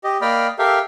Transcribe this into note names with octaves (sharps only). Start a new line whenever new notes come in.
G4 D#5
A#3 D5 D#5 G5 B5 F6
G4 A4 A#4 E5 F5 G5